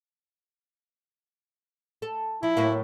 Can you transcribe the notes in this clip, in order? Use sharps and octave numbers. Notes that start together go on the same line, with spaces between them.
A4
F3 E4
A2 F#3 A#3